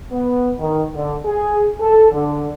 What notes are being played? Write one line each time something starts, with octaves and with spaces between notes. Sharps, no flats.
B3
D#3
D3
G#4
A4
D3